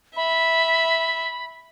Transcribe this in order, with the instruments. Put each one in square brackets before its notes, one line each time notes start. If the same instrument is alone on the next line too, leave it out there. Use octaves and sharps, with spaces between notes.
[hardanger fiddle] E5 [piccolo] B5